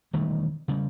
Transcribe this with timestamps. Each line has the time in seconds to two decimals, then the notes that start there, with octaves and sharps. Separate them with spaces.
0.13 E1 D#3 G3 A3
0.68 C#3 G3